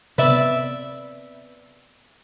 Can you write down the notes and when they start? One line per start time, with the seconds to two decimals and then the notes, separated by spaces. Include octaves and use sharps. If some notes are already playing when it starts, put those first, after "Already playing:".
0.18 C3 B3 B4 D5 E5